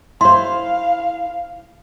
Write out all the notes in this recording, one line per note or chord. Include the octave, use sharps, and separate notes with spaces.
E4 C5 F5 C6